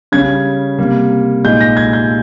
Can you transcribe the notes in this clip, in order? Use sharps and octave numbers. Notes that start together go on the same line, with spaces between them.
C#3 G3 C#4 G#6
C3 G3 A#3
A#2 G#3 D#4 G6
A#6
G#6
G6